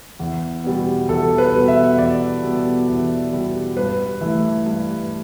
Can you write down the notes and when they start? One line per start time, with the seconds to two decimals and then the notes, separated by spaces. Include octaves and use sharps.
0.19 E2
0.64 B2 G3 B3
1.08 E2 A4
1.38 B4
1.54 B2 G3 B3
1.68 E5
1.98 E2 D5
2.42 B2 G3 B3
2.88 E2
3.32 B2 G3 B3
3.77 G2 B4
4.21 E3 A3
4.66 G2